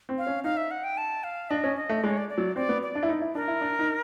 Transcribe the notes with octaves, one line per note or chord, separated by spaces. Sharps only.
C4
F5
C#4
D#4 F5
E5
F#5
G5
A5
F5
D4 D#5
C#4
D#5
A3
G#3 D5
C#5
D5
D5
F#3
C4 D5
B3
D5
D4
E4
D#4
E4
D4 A#4
E4
D4
D#4